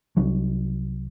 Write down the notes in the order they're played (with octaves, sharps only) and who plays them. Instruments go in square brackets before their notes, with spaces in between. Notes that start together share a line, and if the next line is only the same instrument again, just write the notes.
[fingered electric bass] C2 F#3